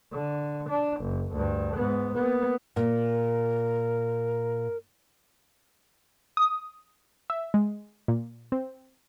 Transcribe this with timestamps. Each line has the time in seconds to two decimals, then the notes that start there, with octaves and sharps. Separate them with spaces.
0.13 D3
0.69 D4
1.01 F#1
1.33 D2 G2
1.76 G#2 B3
2.14 A#3 B3
2.76 A#2 A#4
6.37 D#6
7.30 E5
7.54 G#3
8.08 A#2
8.52 C4